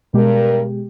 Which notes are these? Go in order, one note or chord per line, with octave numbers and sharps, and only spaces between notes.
G2 B2 G#3 G4 A#4